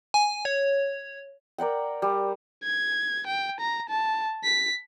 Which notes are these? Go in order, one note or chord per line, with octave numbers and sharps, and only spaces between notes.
G#5
C#5
A#4 D5 F#5 G5
G3
G#6
G5
A#5
A5
B6